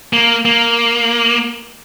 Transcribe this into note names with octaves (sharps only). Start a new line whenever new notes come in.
A#3
A#3